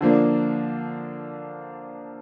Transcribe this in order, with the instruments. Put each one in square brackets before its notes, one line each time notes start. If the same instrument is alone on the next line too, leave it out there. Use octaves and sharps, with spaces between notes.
[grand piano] D3 F3 A#3 D4